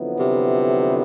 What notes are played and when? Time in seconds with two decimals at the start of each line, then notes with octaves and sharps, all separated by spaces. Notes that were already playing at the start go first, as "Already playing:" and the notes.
Already playing: F2 D3 F#3 B3 E4
0.19 C3